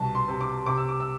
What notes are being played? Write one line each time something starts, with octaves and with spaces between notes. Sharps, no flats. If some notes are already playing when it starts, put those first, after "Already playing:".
Already playing: C2 B2 A5
C6
C3
D6
C3 D6
E6
D6
E6